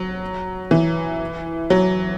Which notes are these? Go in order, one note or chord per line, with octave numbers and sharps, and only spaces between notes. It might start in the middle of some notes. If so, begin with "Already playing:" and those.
Already playing: F#3
E3
F#3